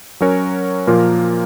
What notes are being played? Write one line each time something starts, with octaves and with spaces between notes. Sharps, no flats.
F#3 C#4 F#4 A#4 C#5
A#2 F3 A#3 F4 A#4